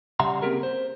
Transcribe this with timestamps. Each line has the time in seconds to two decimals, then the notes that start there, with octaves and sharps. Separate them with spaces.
0.20 C#3 G3 E5 F#5 A#5 C6
0.42 A#3 C4 C#4 G4 G#4 A#4
0.63 C5